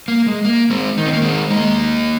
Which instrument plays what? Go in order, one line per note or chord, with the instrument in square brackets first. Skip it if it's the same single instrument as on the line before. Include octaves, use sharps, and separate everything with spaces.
[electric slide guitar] A#3
G#3
A#3
G#3 C4
[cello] D#3 [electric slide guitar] D#4
[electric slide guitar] C4
A#3
G#3 C4
[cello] G#3 [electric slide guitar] A#3 D#4